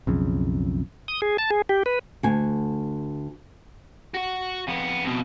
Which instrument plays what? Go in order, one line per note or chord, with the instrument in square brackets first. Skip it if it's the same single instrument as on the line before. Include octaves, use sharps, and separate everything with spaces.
[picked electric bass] B1 F2 C#3
[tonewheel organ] D#6
G#4
A5
G#4
G4
B4
[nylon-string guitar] D2 G#5
[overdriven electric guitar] F#4 F#5
F2 B3
F2 B2